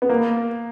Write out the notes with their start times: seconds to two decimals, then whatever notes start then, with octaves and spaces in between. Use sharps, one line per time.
0.02 B3
0.09 A#3